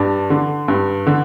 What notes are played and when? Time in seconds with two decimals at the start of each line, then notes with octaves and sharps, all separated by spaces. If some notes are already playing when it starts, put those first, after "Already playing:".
Already playing: G2 D4
0.30 D3
0.68 G2
1.07 D3